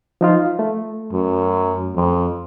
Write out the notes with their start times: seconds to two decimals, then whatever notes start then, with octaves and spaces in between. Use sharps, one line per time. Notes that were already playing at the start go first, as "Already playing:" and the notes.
0.21 F3 D#4 F4
0.59 A3
1.13 F#2
1.95 F2